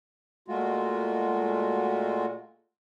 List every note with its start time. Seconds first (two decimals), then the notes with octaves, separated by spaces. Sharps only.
0.48 A#2 G#3 A3 F4 F#4